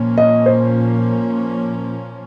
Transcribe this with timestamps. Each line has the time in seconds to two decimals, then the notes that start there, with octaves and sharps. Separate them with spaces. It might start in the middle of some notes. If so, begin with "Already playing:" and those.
Already playing: A#2 F3 A#3 C#4
0.18 D#5
0.46 C5